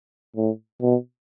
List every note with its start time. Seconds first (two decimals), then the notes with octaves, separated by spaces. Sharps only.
0.36 A2
0.82 B2